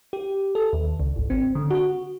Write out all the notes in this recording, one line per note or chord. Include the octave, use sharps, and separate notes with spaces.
G4
A4
D#2
C#2
G#1
C4
D3
F#4